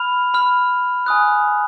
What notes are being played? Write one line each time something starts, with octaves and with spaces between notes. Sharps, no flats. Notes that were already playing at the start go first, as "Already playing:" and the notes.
Already playing: B5 F6 F7
B5 F6
G#5 D#6 F#6